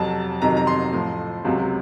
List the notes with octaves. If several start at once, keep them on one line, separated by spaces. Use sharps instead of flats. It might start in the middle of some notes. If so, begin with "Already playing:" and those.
Already playing: F2 C3 F#3 A5
F2 C3 D#3 F#3 A#5
A#5
C6
A2 F3
C#2 C3 F#3